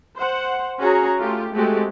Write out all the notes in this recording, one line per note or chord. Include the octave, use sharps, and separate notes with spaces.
C5 F#5
C#4 F#4 G#4 C#5 A#5
A3 F4 G4
G#3 A3 C4 F#4 G4